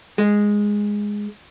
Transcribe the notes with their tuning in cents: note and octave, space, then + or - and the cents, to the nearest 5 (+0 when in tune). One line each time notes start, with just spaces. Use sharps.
G#3 -5